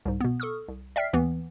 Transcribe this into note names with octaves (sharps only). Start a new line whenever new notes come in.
C2 G#2
B2 B3
A4 C#6 D#6 F6
C2
D5 E5 G5 F6 B6 C7
D#2 E3 B3